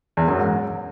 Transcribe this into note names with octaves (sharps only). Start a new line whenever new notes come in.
E2
F#2
G#2